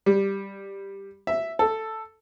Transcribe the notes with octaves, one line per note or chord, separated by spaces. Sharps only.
G3
E5
A4